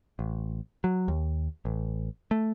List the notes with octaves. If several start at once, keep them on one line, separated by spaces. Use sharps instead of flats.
A1
F#3
D#2
A1
A3